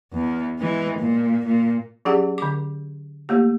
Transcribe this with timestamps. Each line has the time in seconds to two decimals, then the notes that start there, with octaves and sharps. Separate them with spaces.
0.13 E2
0.59 E3 G#3
0.99 A#2
1.46 A#2
2.05 F#3 C#4 G4 G#4 F#5
2.38 D3 D6
3.29 A3 A#3 G4